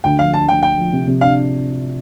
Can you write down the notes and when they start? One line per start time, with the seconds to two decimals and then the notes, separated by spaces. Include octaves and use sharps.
0.04 D2 G5
0.19 F3 F5
0.33 D4 A5
0.48 D2 G5
0.62 D4 G5
0.78 F3
0.93 C3
1.07 C3
1.21 D4 F5